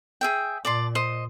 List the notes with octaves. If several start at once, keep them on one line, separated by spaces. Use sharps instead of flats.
G#4 E5 G5
A#2 D5 A5 C6
C5 D#5